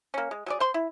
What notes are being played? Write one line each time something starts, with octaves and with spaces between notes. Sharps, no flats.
A#3 C#4
G#3
F#3 G#4 D5
C5 C6
E4